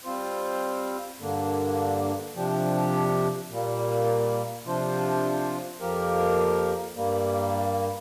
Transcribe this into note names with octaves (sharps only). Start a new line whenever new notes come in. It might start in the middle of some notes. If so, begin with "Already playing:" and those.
G3 C4 F4 C5
G2 D3 A#3 D4
C3 F3 D4 G4
A#2 G3 A#3
C3 F3 D4 F4 C5
F2 F3 A#3 G4 A#4
G2 G3 A#3